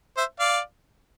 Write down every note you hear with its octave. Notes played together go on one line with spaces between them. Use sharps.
C5 E5
D5 F5